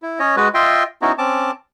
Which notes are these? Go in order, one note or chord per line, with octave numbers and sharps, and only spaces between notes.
E4
C#4 C#5 D#5
G#3 F#4 B4
F4 D#5 E5 G5 C6
B3 C#4 D#4 E4 F#4
C4 C#4 A5 D6